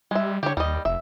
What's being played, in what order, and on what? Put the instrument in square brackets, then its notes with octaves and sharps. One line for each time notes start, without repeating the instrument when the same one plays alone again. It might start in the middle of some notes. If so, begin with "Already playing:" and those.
[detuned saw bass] G3 [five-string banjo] G#3 E5
[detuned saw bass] D3 [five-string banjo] G4 C#5
[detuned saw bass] D#2 [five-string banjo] G3 D#5
[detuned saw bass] F1 [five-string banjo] E5